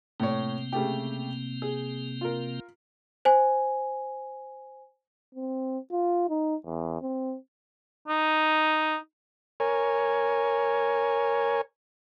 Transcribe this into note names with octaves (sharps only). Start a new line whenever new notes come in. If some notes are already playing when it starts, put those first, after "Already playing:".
A2 C3 A#3 C4 C#5
C#3 A3 G4
G#4
F4 A#4
C5 G#5
C4
F4
D#4
E2
C4
D#4
A#4 C#5 G#5